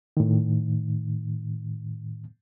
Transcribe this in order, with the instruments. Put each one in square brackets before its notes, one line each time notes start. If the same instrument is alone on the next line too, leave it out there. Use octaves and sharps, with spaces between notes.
[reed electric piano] A2 D#3